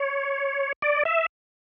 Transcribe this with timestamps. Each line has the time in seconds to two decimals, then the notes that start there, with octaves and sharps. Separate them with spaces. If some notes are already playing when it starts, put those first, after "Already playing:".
Already playing: C#5
0.82 D5
1.05 E5